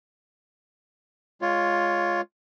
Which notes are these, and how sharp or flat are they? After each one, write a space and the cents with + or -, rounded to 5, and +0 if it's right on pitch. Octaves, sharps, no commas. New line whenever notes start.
G#3 +0 F4 +5 C#5 +15